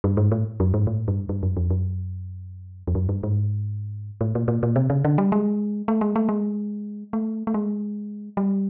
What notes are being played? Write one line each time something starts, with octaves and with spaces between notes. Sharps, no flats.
G2
G#2
A2
F#2
G#2
A2
G2
G2
F#2
F2
F#2
F2
F#2
G2
G#2
A2
A#2
A#2
A#2
C3
C#3
D3
G3
G#3
A3
G#3
A3
G#3
A3
A3
G#3
G3